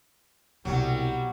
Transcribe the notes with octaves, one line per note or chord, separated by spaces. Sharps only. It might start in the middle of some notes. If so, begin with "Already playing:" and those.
C2 B2 F#3 G3